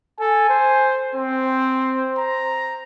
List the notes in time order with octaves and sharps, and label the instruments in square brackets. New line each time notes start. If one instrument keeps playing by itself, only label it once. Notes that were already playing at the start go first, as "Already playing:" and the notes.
[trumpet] A4 [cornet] G#5
[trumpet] C5
[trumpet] C4 [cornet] C5
[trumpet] A#5